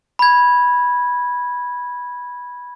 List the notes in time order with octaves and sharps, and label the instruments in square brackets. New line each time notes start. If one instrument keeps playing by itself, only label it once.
[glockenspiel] B5 G#6